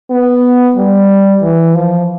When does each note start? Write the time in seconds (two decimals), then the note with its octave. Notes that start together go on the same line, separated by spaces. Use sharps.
0.10 B3
0.76 G3
1.42 E3
1.75 F3